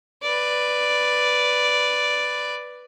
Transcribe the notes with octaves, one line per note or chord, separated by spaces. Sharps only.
B4 D5